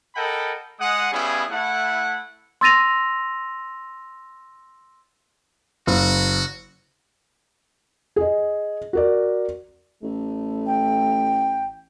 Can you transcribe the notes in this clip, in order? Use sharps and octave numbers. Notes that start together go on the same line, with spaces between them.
A4 A#4 D#5 F#5 G5 B5
G#3 F#5 D#6
G3 B3 C#4 E4 G#4 F5
A3 E4 F#5
C6 E6 A6 A#6 D#7 F7
F#1 F#4
G#4 D#5
F#4 A#4 D5
A1 A3
G5